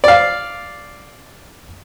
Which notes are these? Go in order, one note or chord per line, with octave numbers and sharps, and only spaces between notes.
D5 F5